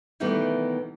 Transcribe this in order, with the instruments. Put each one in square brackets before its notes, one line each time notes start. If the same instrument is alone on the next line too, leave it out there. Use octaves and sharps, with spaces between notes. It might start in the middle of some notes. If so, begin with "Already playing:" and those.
[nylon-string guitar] B2 D#3 E3 G3 A3 B3